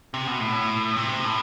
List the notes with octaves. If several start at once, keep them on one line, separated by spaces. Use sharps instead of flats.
C3
B2
A2
C3
A2